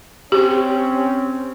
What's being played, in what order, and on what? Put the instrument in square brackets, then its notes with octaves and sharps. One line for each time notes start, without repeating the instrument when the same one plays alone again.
[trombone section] C4 C#4 [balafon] G4